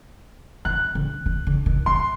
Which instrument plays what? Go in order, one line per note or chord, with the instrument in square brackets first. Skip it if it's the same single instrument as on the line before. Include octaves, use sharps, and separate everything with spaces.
[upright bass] D#3 [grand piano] F#6
[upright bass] D3
D#3
D3
D#3
[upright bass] E3 [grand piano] C6